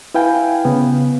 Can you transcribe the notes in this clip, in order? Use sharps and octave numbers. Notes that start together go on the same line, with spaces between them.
E4 B4 F5 G5 G#5
C#3 B3